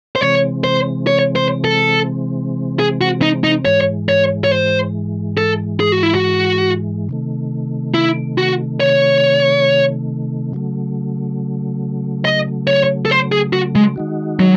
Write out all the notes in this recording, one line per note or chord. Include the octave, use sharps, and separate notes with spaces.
C5
C3 E3 G#3 C4 C#5
C5
C#5
C5
A4
G#4
F#4
D#4
D#4
G#2 E3 G#3 C#5
C#5
C#5
C5
A4
G#4
F#4
E4
F#4
C3 D#3 A3
E4
F#4
C#5
C#3 F#3 A3
D#5
C#5
A4
C5
G#4
F#4
G#3
D#3 G#3 D#4 F#4
F#3